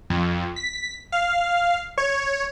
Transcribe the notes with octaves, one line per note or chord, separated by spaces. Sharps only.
F2
B6
F5
C#5